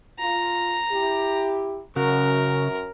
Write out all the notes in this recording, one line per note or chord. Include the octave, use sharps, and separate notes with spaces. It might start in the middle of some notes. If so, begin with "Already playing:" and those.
F4 A#5
E4 G4
F#2 C#3 F#4 A#4